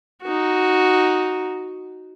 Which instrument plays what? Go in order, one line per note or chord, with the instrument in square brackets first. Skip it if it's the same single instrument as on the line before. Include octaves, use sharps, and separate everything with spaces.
[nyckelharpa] D#4 F#4